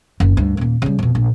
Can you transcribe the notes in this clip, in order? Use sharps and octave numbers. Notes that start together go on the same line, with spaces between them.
F#1 D#3
D2 G2
D#1 A#3
C#3 G3
F2 B2
A#1